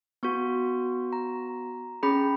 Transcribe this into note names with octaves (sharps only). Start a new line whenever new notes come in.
B3 F#4 C#6
A#5
C#4 G#4 B5